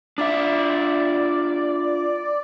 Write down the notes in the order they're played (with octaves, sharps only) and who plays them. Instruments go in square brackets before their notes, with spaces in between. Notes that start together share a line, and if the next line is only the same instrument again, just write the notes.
[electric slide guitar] D4 F4 E5 [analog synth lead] D5